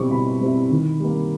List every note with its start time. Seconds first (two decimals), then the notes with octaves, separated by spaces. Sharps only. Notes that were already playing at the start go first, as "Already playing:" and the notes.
Already playing: B2 G3 C4 E4 C#6 D6
0.11 B2 B5
0.41 G3 C4 E4
0.71 D#3
1.00 G3 A#3